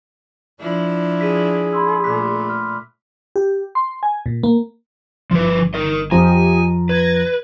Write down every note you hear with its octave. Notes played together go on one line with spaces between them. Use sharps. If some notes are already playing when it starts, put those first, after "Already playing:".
F3 D4 E4
G#4 B6 D#7
B5 C6 E6
A#2 A3 D6 F#6 B6
F6
G4
C6
G#5
A#2
A#3
G1 F3 B4
A#4 D#5
F2 F3 F4 G4 D#5 G#5 A#5
B4 G#6 A#6